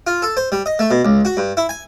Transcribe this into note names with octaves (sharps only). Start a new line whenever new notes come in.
F4
A4
C5
G3
D#5
A3
B2
C#2
F#4
G2
E4
G#5